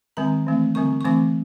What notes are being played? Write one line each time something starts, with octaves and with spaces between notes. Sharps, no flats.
D#3 G#3 C4 A#5
E3 A3 C4
D3 G3 C4 C#6
C#6
E3 A3 C4 D6